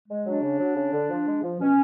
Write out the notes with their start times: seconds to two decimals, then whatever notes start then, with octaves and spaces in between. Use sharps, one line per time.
0.08 G#3
0.25 F#3 D4
0.41 C#3
0.59 F#3
0.75 C#3
0.92 D3
1.10 F3
1.27 G#3
1.42 F3
1.60 B2 C#4